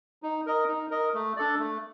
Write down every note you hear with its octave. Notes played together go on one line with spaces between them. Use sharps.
D#4
A#4 D#5
D#4
A#4 D#5
A3
D4 A4 D5
A3